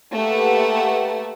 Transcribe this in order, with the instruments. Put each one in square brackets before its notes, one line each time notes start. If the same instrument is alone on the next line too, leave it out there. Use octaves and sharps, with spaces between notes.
[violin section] A3 A#3 G4 B4 F#5 A5